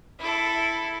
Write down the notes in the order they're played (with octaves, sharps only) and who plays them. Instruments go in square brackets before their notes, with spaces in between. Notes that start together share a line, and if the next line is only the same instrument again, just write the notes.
[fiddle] E4 A4